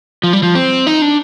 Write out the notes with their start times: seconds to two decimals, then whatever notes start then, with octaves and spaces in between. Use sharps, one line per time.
0.24 F3
0.33 G3
0.43 F3
0.55 C4
0.87 D#4
1.02 D4